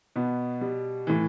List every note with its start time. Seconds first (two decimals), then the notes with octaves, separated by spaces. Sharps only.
0.16 B2 B3
0.61 G3
1.07 A2 E3